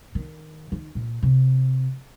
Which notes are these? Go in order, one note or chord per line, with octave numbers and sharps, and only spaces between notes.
D#3
D#3
A#2
C3